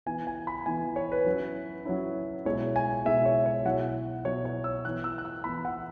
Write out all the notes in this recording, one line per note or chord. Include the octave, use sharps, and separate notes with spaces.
E3 B3 E4 G#5
G#5
B5
E3 B3 E4 G#5
C#5
B4
F#3 C#4 E4
F#3 C#4 E4
B2 G#3 E4 C#5
G#5
B2 G#3 E4 E5
C#5
C#5
B2 F#3 E4 F#5
B2 F#3 E4 C#5
C#5
E6
E3 B3 E4 F#6
E6
F#6
E6
E3 B3 E4 B5
F#5